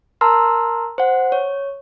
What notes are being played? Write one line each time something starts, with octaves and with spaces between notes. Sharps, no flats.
A#4 A5 A#5 C6 E6 F6
C5 F#5
C#5